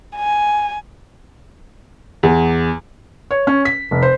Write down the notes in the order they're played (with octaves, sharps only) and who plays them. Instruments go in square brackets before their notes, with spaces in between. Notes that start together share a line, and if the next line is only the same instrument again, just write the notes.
[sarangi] G#5
[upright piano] E2
[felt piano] C#5
C#4
B6
F1
C5